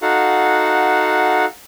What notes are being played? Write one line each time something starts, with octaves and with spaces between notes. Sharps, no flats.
D#4 F#4 A4 F5 F#5